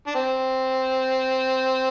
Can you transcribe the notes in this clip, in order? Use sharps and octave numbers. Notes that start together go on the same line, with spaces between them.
D4
C4